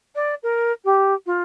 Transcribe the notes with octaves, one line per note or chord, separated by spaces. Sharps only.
D5
A#4
G4
F4